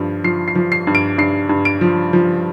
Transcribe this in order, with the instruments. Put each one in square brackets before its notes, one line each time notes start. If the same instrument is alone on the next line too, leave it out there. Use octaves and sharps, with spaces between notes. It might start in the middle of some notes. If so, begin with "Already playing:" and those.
Already playing: [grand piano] G2 F3
F3 C7
C7
F3
C7
G2
D7
G2 C7
G2
D7
F3
F3